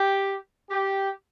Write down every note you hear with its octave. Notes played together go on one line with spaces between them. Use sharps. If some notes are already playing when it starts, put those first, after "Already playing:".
Already playing: G4
G4